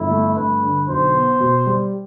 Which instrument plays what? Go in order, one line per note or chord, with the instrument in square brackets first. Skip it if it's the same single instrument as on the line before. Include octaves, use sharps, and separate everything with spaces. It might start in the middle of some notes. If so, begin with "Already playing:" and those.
Already playing: [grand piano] G1 [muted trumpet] E4
[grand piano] A3
[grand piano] G2 [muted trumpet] B4
[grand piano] D3
[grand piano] B1 [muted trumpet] C5
[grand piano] B3
B2
G3